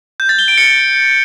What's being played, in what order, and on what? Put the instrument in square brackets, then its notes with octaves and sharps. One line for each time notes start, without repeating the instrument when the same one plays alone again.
[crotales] G6
A6
G7
D7
C#7